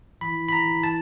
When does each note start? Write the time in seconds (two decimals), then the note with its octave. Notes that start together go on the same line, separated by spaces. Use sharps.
0.21 E3 B5
0.49 B5
0.52 A#5
0.83 A5